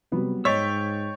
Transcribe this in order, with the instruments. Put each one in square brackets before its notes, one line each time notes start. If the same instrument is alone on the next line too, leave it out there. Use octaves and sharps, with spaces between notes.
[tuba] C3 [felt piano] F#3 G3 B3
[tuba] G#2 [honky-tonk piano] C#5 [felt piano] D#5 A6 B6 [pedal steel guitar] G5 C#6 E6